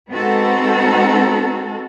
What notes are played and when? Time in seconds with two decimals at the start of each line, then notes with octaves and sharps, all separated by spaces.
0.10 G#3 B3 C4 D#4 F#4 A4